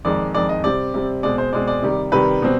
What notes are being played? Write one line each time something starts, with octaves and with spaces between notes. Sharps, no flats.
F2 D#3 G#3 D5
F2 D#3 G#3 D5
D#5
C3 G3 C4 D5
C3 G3 C4
B2 G#3 C4 D5
C5
B2 G#3 C4 D5
D5
C3 D#3 G3
C3 D#3 G3 B4
B2 G3 C4